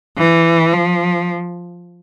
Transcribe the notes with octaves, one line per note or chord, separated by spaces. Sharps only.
E3
F3